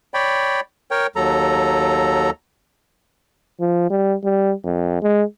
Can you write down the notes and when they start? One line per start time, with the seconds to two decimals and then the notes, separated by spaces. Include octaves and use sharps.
0.14 C#5 D5 G5 B5
0.91 A#4 C#5 G5
1.16 D#2 F#3 A4 A#5
3.60 F3
3.90 G3
4.24 G3
4.65 F2
5.02 G#3